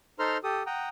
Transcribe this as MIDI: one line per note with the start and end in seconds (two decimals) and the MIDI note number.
0.19 0.38 63
0.19 0.38 69
0.19 0.38 72
0.19 0.38 82
0.19 0.38 84
0.19 0.38 89
0.44 0.63 67
0.44 0.63 69
0.44 0.63 87
0.66 0.89 78
0.66 0.89 79
0.66 0.89 82
0.66 0.89 87